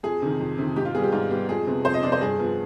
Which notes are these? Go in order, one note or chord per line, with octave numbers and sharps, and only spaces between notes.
F2 G#4
C3 D#3
F2
C3 D#3
G#2 G4
F4
G3 B3 G#4
G4
G#2 F4
G3 B3 G4
F2 G#4
C3 F3 B3
F2 C5
D#5
C3 F3 B3 D5
C5
G2 G#4
F3 B3